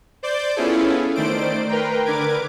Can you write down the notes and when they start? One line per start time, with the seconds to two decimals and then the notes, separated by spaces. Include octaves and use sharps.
0.23 C5 D5 D6 G6
0.56 B3 C#4 E4 F4 G#4 A4
1.15 D#3 A3 C5 D5 D7
1.68 A#4 B4 G5 A#5 C6
2.05 D3 A#4 B4 D6 G#6 D7